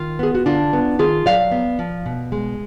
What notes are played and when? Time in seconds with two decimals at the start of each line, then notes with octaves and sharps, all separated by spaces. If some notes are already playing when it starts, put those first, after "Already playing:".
Already playing: D#3 F4
0.19 B3 G#4
0.35 F#4
0.46 D3 D4 F4
0.73 B3
0.99 D#3 F4 G#4
1.26 F#3 D5 F5
1.51 B3
1.79 F3
2.06 B2
2.32 G#3